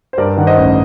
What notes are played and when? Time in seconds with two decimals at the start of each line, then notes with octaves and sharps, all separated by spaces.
0.13 C5
0.18 G2 A#4 D5
0.37 D#3 F#5
0.47 C5 D#5
0.57 A1